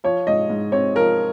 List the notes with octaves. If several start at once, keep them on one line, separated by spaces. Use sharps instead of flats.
F3 C#5
G#2 D#5
G#2
C4 C#5
F3 A#4